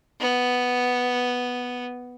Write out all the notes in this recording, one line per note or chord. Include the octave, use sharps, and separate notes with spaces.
B3